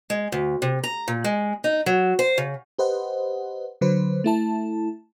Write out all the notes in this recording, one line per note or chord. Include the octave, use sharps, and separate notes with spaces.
G#3
D2
C3
A#5
A#2
G#3
D#4
F#3
C5
C#3
G4 B4 C5 D#5 F#5
D3 F#3 B4 C5
A3 E4 A5